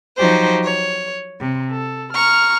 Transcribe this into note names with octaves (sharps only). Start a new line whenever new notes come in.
F3 F#3 D#4 F#4 G4 C5
C#5
C3
A4
A#5 C#6 F6